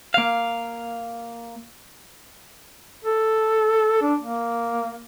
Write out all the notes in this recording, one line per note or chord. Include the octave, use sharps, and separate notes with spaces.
A#3 F5
A4
D4
A#3